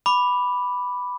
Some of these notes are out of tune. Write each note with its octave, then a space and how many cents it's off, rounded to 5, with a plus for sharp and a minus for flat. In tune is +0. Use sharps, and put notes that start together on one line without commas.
B5 +0 D6 +0